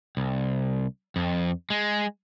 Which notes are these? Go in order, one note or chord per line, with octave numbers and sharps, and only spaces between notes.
C2
F2
G#3